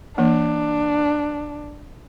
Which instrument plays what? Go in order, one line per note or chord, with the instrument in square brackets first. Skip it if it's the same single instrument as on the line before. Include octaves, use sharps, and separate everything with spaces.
[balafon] E3 A#3 [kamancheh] D4